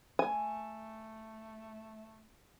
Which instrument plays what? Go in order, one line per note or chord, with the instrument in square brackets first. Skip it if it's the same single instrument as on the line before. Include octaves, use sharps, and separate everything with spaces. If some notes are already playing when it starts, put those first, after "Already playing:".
[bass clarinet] A3 [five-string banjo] G#5